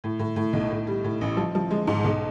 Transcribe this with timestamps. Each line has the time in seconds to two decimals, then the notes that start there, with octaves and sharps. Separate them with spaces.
0.04 A2
0.19 A2
0.36 A2
0.53 B1
0.71 A2
0.87 G3
1.04 A2
1.21 A1
1.37 F3
1.55 F3
1.71 G#3
1.87 G#2
2.04 B1